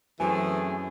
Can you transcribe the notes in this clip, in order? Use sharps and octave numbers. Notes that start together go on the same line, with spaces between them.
F#2 E3 A3 C4 G#4 G#5